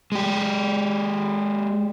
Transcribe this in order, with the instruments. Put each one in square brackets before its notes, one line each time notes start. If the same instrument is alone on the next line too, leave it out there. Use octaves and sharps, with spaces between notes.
[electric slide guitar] G#3 G4